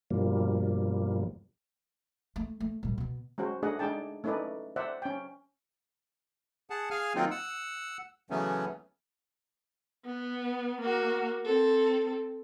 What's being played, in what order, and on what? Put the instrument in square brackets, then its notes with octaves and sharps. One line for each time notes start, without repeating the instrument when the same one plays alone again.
[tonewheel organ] G2 B2 F3 G3 A#3
[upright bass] A3
A3
A#2 G3
B2 B3
[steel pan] G#3 C#4 F#4 C5
A3 D4 G#4 D#5 F#5
G#3 D4 D#4 G#4 G5 A5
A3 C#4 D#4 E4 B4 D5
C5 D5 E5 F#5
C#4 G5
[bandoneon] G#4 F#5 A5
G#4 F5 G#5 F6
D#3 F#3 A#3 C4 D#4 F4
F#5 E6
C#3 E3 F#3 A3 B3 C#4
[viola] B3
A#3 F#4
C4 A4